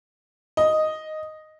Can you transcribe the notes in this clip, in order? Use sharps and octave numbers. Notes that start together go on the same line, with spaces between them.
D#5